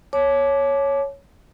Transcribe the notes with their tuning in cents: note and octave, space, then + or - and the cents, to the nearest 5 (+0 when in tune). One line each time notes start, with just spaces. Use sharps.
C#5 +0 A5 -35 D6 +0